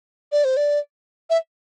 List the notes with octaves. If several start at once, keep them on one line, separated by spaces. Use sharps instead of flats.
D5
C5
D5
E5